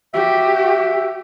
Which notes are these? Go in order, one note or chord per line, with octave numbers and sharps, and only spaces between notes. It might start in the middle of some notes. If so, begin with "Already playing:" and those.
F#4 G4 E5